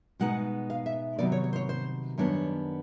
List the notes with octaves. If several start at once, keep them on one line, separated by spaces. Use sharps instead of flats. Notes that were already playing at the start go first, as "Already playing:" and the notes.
B2 G#3 B3 D#4 F#5
F5
E5
C3 D#3 F#3 B3 D5
C#5
C#5
C5
C#5
C5
F#2 D#3 G3 B3 D4 C#5